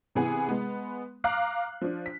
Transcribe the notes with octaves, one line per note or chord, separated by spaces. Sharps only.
C3 E3 B3 G#4
G#3 B3
F5 A#5 D6 F6 F#6 C7
F3 D4
B6